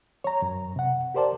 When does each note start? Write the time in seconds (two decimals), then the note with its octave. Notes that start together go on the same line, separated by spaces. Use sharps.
0.24 C#5 A#5
0.42 F#2
0.76 C3 F#5
1.14 G4 A#4 C5 D5 A5